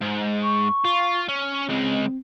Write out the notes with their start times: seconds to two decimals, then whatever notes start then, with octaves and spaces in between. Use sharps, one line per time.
0.02 G#2
0.43 C#6
0.85 F4
1.28 C#4
1.69 C#2 G#3 C4